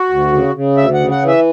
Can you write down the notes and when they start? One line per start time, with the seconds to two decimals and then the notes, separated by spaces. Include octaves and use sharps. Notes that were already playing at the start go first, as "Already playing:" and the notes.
Already playing: F#4
0.10 D2
0.33 C#3
0.55 C#3
0.77 D2 E5
0.94 F#5
1.00 C#3
1.11 F#5
1.22 E3
1.28 E5